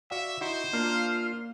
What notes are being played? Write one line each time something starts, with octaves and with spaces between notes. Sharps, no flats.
F#4 D5 E5 F5
D#4 E4 F#4 C5
A#3 D4 F4